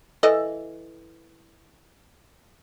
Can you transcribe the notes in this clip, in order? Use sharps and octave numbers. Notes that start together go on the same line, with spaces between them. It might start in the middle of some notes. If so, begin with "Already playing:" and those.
E3 A4 D#5